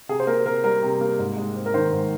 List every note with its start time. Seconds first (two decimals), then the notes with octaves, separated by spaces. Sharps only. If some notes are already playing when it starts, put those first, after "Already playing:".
0.09 C3 G#4
0.20 C5
0.27 A#3 A#4
0.45 C3 A#4
0.64 G3 A#4
0.82 C3
1.01 A#3
1.19 G#2
1.37 G#3
1.56 C4
1.66 A#4
1.74 D#3 C5
1.92 G#2